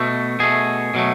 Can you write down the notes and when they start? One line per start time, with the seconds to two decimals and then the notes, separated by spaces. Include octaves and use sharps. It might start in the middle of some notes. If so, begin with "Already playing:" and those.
Already playing: B2 A3
0.40 B2 A3 G#4
0.94 B2 F#3 A3